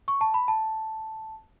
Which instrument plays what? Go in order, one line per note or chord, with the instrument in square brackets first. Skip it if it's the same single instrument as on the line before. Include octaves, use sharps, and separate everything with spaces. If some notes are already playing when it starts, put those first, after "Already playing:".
[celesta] C#6
A5
B5
A5